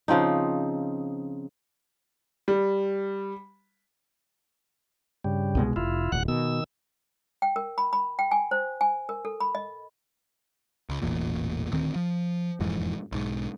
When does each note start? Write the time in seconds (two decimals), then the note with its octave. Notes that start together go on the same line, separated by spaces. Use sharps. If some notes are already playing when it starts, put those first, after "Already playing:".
0.08 C#3 F3 C4 D#4
2.48 G3
5.24 G2 C#3 G3
5.55 C2 B2 G#3
5.76 F1 E4 F4
6.12 D1 F#5 F#6
6.28 B2 D#3 E6
7.42 G5
7.56 A#4
7.78 B5
7.93 B5
8.19 G5
8.31 G#5
8.51 C5
8.81 G#5
9.09 A#4
9.25 A4
9.40 B5
9.55 D#5
10.89 C#2
11.02 E1 A1 E2 A#2
11.71 D#1 D2 D#3 C4
11.96 F3
12.60 E1 F2 G#2 E3
13.12 B1 G#2